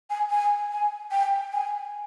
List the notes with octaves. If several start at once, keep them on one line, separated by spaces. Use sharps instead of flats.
G#5
G#5
G#5
G5
G#5